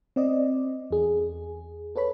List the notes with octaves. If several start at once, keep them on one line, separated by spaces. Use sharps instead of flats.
C4 D5 D#5
E2 G#4
A4 B4 C#5 B5